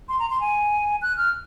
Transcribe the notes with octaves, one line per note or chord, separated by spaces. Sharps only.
C6
A#5
C6
G#5
F#6
F6